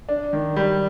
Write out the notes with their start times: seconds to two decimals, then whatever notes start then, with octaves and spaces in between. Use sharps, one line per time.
0.09 D4
0.33 D#3
0.56 G3